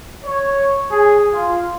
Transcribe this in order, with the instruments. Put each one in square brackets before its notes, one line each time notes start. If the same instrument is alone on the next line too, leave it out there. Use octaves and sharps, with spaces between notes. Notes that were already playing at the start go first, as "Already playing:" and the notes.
[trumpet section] C#5
G#4
F4